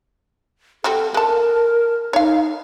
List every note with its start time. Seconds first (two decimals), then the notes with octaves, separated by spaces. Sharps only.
0.84 G3 C4 F#4 A4
1.14 G#3 A#4 A5
2.13 D#4 C#5 F5